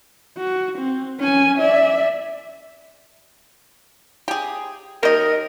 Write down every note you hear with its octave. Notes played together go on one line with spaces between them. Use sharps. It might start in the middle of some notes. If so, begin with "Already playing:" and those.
F#4
C4
C#4 G#5
D5 E5
G4 G#4
D#3 A#4 D#5